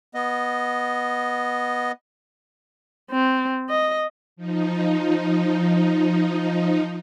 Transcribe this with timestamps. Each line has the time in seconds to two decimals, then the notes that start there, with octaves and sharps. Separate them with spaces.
0.14 B3 D#5
3.11 C4
3.69 D#5
4.36 F3 D#4